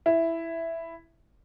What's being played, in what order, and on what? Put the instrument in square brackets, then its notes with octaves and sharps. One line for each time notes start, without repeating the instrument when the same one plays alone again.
[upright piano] E4